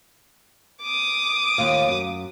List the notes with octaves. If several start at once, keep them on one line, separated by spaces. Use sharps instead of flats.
D6 D#6
D#2 F4 F5
F#2